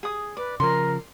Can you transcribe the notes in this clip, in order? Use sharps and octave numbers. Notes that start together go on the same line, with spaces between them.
G#4 D#6
B4 D5
C#3 F3 A#4 C6